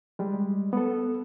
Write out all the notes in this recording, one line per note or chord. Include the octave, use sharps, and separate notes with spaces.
G3 G#3
B3 A4